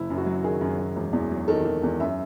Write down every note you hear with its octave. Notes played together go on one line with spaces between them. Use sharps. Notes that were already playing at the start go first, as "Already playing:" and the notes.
Already playing: F#1 E4
F#2
F#4
F#3
D#3 G#4
F#2
F#2
E1
E2
F#3
D#3 A4
D#3
E2
F#2 E5